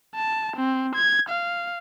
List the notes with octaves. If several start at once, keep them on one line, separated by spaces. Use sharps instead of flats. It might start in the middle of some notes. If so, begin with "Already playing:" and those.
A5
C4
G#6
F5